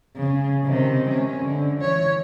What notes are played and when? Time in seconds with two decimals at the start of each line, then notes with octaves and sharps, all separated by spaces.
0.16 C#3
0.64 C3 D#3
1.10 C#4
1.41 D3
1.81 E3 C#5